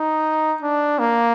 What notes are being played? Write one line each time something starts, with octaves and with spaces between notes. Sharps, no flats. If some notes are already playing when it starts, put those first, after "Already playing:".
Already playing: D#4
D4
A#3